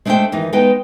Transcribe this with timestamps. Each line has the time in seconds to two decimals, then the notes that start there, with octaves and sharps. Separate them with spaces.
0.05 G#3 A3 D4 A4 C5 G5
0.32 D#2 E3 D#4
0.53 G#3 B3 D#4 B4 G5